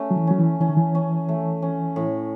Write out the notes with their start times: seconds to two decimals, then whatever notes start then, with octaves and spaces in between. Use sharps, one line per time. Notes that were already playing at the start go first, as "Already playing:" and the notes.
Already playing: A3 C#4
0.11 F#3
0.16 E3
0.27 F#3 C#4
0.38 E3
0.61 E3 C#4
0.69 D#3
0.77 E3
0.95 C#4
1.29 A3
1.62 C#4
1.96 A2